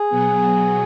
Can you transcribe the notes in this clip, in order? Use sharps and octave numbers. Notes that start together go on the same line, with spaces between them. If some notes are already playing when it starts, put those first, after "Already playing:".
Already playing: G#4
B2 F#3 B3